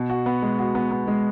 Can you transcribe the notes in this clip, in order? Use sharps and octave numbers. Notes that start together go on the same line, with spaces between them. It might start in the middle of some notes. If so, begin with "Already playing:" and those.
Already playing: B2
F#4
B3
G#3
F#4
B3
B3
G#3